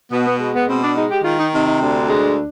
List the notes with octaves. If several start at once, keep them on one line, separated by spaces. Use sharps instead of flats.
B2 B3
B3
G#3
B3
B2 C4
D4
G#3 D#4
G4
D#3 F4
D#4
C3 D#4
D#4
D2 D4
G#3